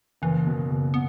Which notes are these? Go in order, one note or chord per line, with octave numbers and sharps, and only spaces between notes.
F#1 E3
B2 D#3
F#1 C#3
B3